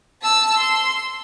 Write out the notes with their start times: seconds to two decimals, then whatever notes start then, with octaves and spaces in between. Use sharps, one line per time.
0.22 A5 E6
0.57 C6